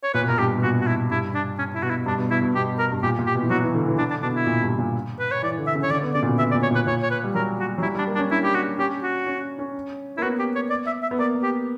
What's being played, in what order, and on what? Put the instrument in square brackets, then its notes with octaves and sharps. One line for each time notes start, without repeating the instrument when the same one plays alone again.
[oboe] C#5
[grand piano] A#2 [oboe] B4
[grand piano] B2
[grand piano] A#2 [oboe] A#4
[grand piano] G2 [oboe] G4
[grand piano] B2
[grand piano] A#2 [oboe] F#4
[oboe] F#4
E4
[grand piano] G2 [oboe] E4
[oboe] D4
C#4
E4
[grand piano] B2 [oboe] F#4
[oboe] E4
[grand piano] G2 [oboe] D4
[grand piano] B2
[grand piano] B2 [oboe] E4
[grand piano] B2
[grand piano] B2 [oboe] G4
[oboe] A#4
[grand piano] G2
[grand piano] A#2 [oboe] G4
[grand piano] A#2
[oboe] G4
[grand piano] B2
E3
[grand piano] F#3 [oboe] F#4
[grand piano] E3
D3
E3
[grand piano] D3 [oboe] D4
[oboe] D4
[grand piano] B2 [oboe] D4
[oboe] E4
[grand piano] A#2
G2
A#2
[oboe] B4
C#5
[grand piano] E3 [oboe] D5
[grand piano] D3
[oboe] E5
[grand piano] C#3
[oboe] C#5
[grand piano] D3 [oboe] D5
[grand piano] B3
[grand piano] C#3 [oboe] D5
[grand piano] A#2
B2
[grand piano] B2 [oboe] E5
[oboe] D5
[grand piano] A#2
[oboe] C#5
[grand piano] A#2 [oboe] B4
[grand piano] A#2 [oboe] C#5
[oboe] C#5
B4
[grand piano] G3
[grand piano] F#3 [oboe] A#4
[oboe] F#4
[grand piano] F#3
[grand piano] G3 [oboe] E4
[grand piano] G3 [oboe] D4
[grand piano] A#3
[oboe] D4
[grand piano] C#4
[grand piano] D4 [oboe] E4
[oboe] G4
F#4
[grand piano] C#4 [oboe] G4
[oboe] F#4
[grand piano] C#4
C#4
[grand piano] A#3 [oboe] E4
[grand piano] B3 [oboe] F#4
[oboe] G4
C#5
D5
E5
E5
[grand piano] B3
[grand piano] A#3 [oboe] D5
[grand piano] A#3
[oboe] G4